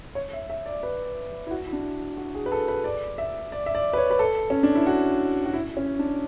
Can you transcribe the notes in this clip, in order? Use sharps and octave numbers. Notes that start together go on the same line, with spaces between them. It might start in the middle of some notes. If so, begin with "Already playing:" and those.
C#5
E5
E5
D5
B4
E4
F#4
E4
D4
F#4
G#4
B4
A4
B4
D5
E5
D5
E5
D5
B4
C#5
B4
A4
C#4
D4
E4
F#4
F#4
E4
C#4
D4